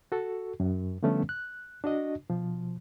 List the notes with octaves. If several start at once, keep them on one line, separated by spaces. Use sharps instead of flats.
F#4 A4
F#2
D3 F3 G3 A3 B3 C#4
F#6
D4 F#4 D#5
B2 F3